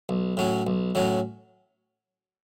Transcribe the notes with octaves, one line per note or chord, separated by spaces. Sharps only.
B1
A2 F#3 C#4
B1
A2 F#3 C#4